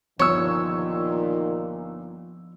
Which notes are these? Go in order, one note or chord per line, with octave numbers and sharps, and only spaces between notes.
G1 A#2 D#3 F3 F4 C#5 E6